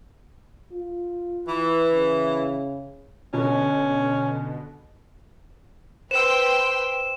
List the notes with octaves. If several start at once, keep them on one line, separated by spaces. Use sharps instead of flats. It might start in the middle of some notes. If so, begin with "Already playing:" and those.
F4
E3
C#3
B2 D3 C#4
B4 C5 G5 C6 E6 E7